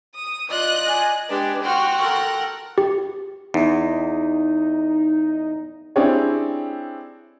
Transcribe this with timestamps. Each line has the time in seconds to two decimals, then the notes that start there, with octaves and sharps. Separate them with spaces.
0.15 D#6
0.50 F4 D5 D#5 F#6
0.88 G#5
1.30 G#3 D4 G4 B4
1.63 F#4 F#5 G5 C6 F6
1.99 A4 A#4 F#5
2.78 G4
3.54 E2 D#4
5.96 C4 D4 E4 G4 G#4 C#5